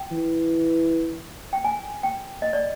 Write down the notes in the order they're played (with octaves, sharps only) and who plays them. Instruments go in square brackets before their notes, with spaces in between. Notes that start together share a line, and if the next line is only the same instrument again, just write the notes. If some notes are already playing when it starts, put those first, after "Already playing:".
Already playing: [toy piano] G5
[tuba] E3
[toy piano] G5
G#5
G5
D#5
D5